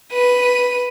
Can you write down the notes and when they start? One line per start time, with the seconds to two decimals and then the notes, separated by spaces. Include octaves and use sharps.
0.12 B4 D#7